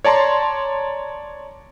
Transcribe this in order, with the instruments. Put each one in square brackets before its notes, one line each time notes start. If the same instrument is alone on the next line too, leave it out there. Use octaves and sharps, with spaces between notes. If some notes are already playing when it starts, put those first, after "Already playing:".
[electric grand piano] C#5 D5 A5 A#5 C6